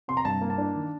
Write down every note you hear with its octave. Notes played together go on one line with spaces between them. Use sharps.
C3 C6
A#5
G2 A5
A#3
A5
D4
D#3